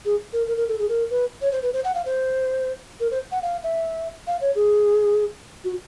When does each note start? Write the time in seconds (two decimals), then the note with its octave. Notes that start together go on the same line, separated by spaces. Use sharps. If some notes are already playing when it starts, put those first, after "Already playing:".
0.05 G#4
0.33 A#4
0.47 A#4
0.57 A#4
0.68 A4
0.79 G#4
0.89 A#4
1.10 B4
1.42 C#5
1.52 C5
1.63 B4
1.73 C5
1.84 F#5
1.95 F5
2.06 C5
3.00 A#4
3.11 C5
3.32 F#5
3.42 F5
3.64 E5
4.27 F5
4.41 C#5
4.55 G#4
5.64 F#4